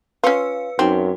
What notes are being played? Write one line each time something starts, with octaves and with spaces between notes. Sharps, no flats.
C#4 F4 B4 F5 E6 C#7
F#2 C4 D#4 F#4